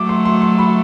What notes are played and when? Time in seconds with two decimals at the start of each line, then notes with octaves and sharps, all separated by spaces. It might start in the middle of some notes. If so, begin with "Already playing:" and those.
Already playing: F#3 A3 D6
0.09 C6
0.25 C6
0.42 C6
0.59 B5